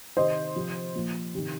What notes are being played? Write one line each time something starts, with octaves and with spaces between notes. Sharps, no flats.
C3 D#3 C5 D#5
C3 F3
A#2 F3
C3 D#3